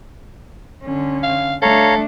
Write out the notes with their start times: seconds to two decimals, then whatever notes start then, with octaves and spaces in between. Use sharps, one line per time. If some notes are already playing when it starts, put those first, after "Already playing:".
0.83 D3 C#4
1.23 F5
1.62 A3 D4 A4 C#5 F5 A#5